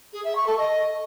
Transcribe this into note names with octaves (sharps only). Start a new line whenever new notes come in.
G#4
E5
C#6
A4
D#5